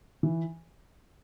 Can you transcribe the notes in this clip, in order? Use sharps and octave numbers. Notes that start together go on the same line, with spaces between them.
E3